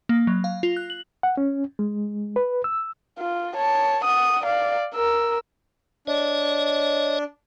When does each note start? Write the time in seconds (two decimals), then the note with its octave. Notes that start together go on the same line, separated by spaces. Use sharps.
0.09 A#3
0.27 F#3
0.44 F5
0.63 F4
0.77 F#6
0.90 F#7
1.23 F#5
1.37 C#4
1.79 G#3
2.36 B4
2.64 E6
3.19 F4
3.56 C#5 A5
4.05 F#5 D#6
4.43 D5 F5
4.95 A#4 E6
6.07 D4 C#5 D#5